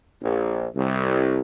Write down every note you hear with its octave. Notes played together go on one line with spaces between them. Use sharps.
A#1
C2